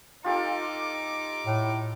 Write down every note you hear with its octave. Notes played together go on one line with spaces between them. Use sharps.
D#4 F4 G4 A4 D6
A2